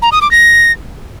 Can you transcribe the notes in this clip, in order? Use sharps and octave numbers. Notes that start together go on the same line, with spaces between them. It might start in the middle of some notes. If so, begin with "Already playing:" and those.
A#5
D#6
D6
A#6